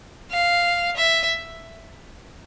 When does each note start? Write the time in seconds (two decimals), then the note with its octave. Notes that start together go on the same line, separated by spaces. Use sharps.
0.31 F5
0.97 E5